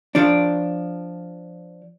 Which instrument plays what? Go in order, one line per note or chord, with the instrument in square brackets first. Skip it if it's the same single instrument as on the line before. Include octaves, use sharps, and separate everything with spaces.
[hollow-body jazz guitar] F3 D4